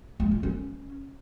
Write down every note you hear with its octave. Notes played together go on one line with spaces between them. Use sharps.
G#3
F4
C#4